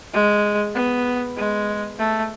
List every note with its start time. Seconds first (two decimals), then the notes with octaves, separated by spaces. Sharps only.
0.14 G#3
0.75 B3
1.36 G#3
1.99 A3